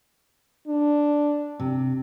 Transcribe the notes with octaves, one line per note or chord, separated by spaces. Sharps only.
D4
C3